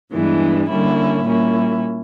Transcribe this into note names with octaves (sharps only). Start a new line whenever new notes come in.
G2 E3 G#3 B3 D4
D3 G3 A#3 C#4 E4
A#2 G3 A#3 C#4 E4